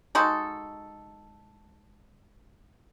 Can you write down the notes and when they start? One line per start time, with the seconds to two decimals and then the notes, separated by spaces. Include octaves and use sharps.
0.15 G#3 D#4 F#4 A4